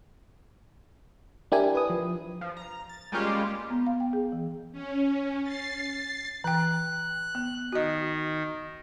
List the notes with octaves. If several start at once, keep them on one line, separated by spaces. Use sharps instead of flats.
D4 E4 G4 A#4 G#5
B4 D#6
F3
F3
A#5
A6
G3 G#3 A#3 C#4 F4 G4
B3
F5
G5
G#4
E3
C#4
A6 C7
E3 G5 F#6
B3
D#3 F#4 D#5